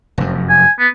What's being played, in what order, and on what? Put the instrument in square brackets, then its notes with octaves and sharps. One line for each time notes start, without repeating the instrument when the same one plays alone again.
[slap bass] F1 F#2
[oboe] G#5
B3